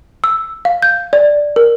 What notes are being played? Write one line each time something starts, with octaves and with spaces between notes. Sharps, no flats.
E6
F5
G6
D5
A#4